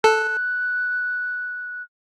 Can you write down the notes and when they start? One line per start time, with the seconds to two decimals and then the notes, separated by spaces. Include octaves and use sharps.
0.04 A4 F#6